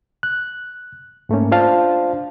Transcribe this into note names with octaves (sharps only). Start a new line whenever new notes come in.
F#6
G#2 A3 A#3 C#4
D4 F4 C5 F5 A5